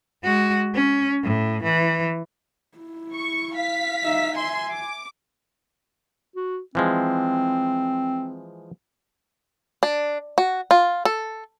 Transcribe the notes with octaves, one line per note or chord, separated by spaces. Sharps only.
G#3 F#4
C#4
A2
E3
E4
C#6
F5 B6
D#4 E5
E5 G#5 C6
D6
F#4
E3 F3 G#3 C4
D4
F#4
F4
A4